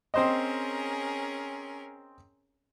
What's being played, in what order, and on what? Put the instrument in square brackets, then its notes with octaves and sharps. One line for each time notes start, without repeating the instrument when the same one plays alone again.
[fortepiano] C4 C5 D#5 [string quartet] C#4 G#4 A#4